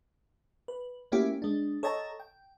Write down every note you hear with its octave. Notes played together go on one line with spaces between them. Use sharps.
B4
A3 A#3 C#4 E4 F#4 G4
G#3 D4
A4 C#5 D#5 G5 A5 A#5
G5